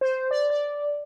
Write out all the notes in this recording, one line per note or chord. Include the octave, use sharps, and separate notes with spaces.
C5
D5
D5